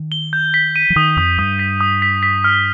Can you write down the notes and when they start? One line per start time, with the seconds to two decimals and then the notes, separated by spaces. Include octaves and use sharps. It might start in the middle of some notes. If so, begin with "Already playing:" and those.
Already playing: D#3
0.12 G7
0.33 G6
0.54 B6
0.76 D#7
0.90 F3
0.96 D#3 D#6
1.17 F2 D#6
1.38 G2 D#6
1.59 B6
1.81 D#6
2.02 B6
2.23 B6
2.44 F6